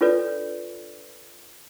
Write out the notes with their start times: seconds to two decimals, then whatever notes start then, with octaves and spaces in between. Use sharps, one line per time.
0.01 D4 F4 A4 B4 C#5 D5